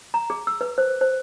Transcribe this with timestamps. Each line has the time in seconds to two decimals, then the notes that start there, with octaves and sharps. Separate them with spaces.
0.14 A#5
0.30 G#4
0.47 E6
0.61 B4
0.78 C5
1.01 C5